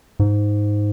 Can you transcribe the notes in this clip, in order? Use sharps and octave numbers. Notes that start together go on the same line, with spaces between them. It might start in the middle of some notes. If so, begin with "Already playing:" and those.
G#2